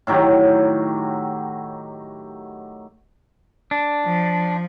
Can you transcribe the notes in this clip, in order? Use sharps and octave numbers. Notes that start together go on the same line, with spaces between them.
A2 D#3 F#3 G4
D4
F3